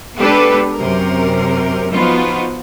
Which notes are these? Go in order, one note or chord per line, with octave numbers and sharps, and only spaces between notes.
G#3 B3 D4 G4 A4 B4
F#2 C3 A#4
F3 B3 D#4 F4 F#4